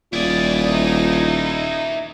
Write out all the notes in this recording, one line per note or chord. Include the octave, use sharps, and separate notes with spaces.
D#1 E4 F4 G#4 D5
D#4